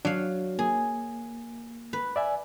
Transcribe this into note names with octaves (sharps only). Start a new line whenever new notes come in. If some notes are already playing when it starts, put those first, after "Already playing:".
F#3 D4 F5
A#3 G#4
B4
D5 E5 G#5